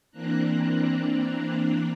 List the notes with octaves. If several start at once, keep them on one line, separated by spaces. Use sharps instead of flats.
E3 A#3 C4 D4 A#5 F#6